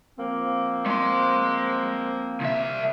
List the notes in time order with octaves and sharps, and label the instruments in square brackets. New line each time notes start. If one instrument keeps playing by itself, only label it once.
[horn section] F3 A#3 C4
[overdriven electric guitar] G#3 C6
C2 E5